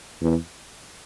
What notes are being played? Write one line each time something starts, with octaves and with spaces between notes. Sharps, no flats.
E2